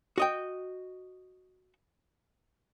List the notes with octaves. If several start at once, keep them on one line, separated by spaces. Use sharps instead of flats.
F#4 D#5 G5